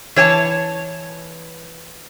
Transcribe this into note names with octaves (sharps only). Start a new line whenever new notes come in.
E3 C#5 G#5 A5